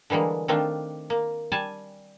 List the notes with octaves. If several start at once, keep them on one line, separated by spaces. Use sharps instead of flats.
D3 E3 G3 G#3 A#3
D#3 A3 C4 D4 F4
A#3
G3 G#5 A5